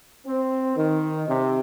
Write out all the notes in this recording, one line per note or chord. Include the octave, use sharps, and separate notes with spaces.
C4
D#3
C3